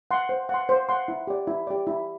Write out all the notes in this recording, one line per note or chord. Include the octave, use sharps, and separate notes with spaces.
F#5 C6
C5
F#5 C6
C5
F#5 C6
E4
G4 D5
E4
G4 D5
E4